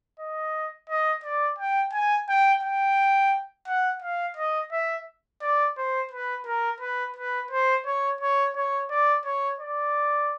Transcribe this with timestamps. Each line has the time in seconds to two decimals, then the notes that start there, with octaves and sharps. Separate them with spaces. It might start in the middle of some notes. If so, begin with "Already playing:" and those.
0.19 D#5
0.89 D#5
1.24 D5
1.59 G5
1.93 G#5
2.29 G5
2.63 G5
3.67 F#5
4.02 F5
4.37 D#5
4.72 E5
5.42 D5
5.77 C5
6.11 B4
6.46 A#4
6.81 B4
7.16 B4
7.51 C5
7.86 C#5
8.21 C#5
8.55 C#5
8.90 D5
9.25 C#5
9.60 D5